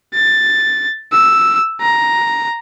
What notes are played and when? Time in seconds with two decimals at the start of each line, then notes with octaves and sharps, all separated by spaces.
0.14 A6
1.12 E6
1.81 A#5